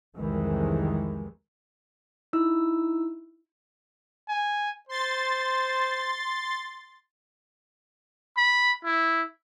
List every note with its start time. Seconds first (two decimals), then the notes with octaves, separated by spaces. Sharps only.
0.18 C2 F2 D#3 E3 G#3
2.33 D#4 E4 E6
4.29 G#5
4.89 C5 C6 A6
8.37 B5
8.85 E4